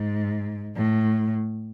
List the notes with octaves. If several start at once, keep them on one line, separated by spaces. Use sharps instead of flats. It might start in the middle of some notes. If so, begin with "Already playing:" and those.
Already playing: G#2
A2